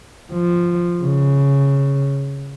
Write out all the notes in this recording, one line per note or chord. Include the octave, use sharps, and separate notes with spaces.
F3
C#3